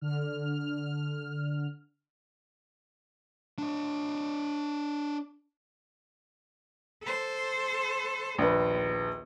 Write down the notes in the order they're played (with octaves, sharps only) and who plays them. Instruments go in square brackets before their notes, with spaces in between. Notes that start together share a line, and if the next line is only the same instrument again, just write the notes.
[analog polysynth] D3 F6
[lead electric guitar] D4 D#5
[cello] A4 C5
[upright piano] A#1 B4 [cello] D#2